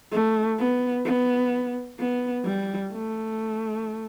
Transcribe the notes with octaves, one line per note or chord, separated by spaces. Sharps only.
A3
B3
B3
B3
G3
A3